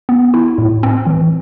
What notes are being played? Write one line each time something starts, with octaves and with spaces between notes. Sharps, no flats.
B3
E4
A2
C4
E3